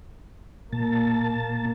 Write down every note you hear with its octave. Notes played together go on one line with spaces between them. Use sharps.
A#2 A#3 A5